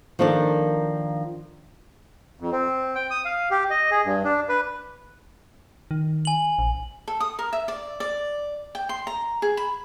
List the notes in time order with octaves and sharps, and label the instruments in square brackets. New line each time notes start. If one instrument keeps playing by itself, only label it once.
[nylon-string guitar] D#3 F3 A#3 D4 A4 D5
[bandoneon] F2
C4
G5
D#6
F5
G4
D#5
G#4
G2
D4
B4
[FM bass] D#3
[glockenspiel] G#5 F#7
[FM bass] A#1
[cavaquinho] A4
D#6
A#4
E5
D5
D5
G5
C6
A#5
G#4
B5